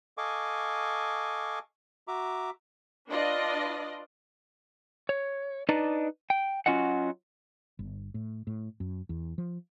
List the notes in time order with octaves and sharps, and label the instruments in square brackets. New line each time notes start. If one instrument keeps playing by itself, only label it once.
[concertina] A4 D#5 F5 G#5 C#6 D6
F#4 E5 A#5 D6
[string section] D4 F4 B4 D5 D#5
[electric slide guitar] C#5
D4 D#4 B4 D5 D#5
G5
F#3 C#4 F4 F#4 D#5 F#5
[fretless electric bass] G1
A2
A2
F#2
E2
F3